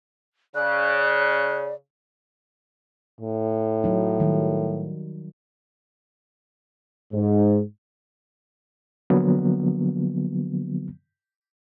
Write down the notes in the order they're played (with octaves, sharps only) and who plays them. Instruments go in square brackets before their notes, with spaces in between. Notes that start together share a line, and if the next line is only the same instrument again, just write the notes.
[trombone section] C#3 [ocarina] D5 [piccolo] F#6
[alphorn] A2
[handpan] F#3 D#4
D#3 F#3 G3
[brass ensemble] G#2
[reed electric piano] D3 F3 F#3 A#3 B3